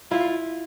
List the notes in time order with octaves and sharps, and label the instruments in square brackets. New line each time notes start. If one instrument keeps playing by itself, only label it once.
[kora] E4 [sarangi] F4